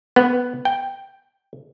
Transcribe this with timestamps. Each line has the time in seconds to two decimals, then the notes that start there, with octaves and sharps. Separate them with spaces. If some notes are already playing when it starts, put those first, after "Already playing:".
0.16 B3
0.65 G5